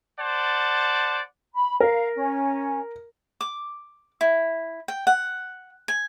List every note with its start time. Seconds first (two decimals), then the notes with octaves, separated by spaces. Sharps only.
0.19 C5 D5 F#5 A5
1.54 B5
1.80 A#4 F5
2.15 C#4
3.41 D6
4.21 E4
4.88 G5
5.07 F#5
5.88 G#5